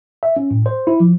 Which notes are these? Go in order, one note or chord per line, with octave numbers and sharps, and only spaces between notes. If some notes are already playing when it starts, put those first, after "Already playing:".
E5
C#4
A2
C5
E4
F3